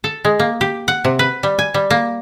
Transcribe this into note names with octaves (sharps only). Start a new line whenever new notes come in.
A4
G#3
A#3
G4
F#5
C3
B4
G3
G#5
G3
A#3